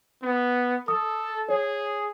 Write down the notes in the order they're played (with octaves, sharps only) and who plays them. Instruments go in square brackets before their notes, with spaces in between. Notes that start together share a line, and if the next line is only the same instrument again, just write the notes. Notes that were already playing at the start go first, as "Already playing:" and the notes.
[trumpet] B3
[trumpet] A4 [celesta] D#6
[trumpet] G#4 [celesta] C#5